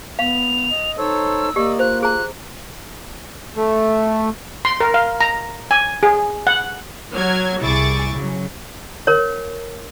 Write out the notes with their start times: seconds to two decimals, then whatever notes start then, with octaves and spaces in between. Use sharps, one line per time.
0.19 B3 F5 F7
0.71 D#5
0.98 D#4 A4 C5 C#5 E6
1.56 A#3 G4 D5 D#5
1.79 F4 C5 F#6
2.02 G#4 A#5 F#6
3.56 A3
4.65 C6
4.80 A#4
4.94 F5
5.21 A#5
5.71 G#5
6.03 G#4
6.47 F#5
7.13 F#3 F6 G#6
7.61 C2 E4 G#4 C#6 D6 A6
8.14 C#3 F#3
9.07 A#4 C#5